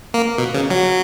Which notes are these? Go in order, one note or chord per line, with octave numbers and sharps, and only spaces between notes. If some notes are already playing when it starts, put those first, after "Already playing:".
A#3
B2
C#3
F#3